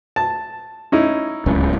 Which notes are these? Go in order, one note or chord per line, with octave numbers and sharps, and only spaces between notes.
A5
C#4 D#4 E4
D1 C#2 C#3